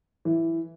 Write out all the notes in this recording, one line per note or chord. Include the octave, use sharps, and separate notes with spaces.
E3